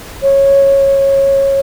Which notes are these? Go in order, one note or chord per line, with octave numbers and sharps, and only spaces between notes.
C#5